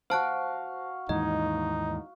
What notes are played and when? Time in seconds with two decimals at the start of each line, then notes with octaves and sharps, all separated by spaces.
0.10 F#4 C5 F5 A5 F#6
1.09 D#2 G#2 E3 D#4 D#5